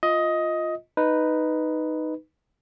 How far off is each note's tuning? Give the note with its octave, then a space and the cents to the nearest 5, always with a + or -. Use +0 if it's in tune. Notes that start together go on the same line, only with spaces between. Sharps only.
F4 +0 D#5 +15
D#4 +0 B4 +0